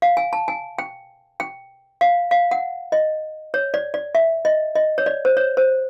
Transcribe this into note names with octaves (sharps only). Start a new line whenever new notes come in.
F5
G#5
A5
G#5
G5
G5
F5
F5
F#5
D#5
C#5
D5
D5
E5
D#5
D#5
C#5
D5
C5
C#5
C5